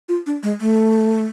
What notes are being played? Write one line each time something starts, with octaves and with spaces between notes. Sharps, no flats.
F4
D4
G#3
A3